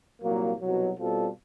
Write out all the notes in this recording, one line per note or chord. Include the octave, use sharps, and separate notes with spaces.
C2 A#2 F#3 A#3
C2 B2 F#3
B2 G3 C4 F4 A4